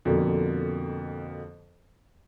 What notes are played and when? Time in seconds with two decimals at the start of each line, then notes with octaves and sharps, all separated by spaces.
0.05 F2 B2 D3 A#3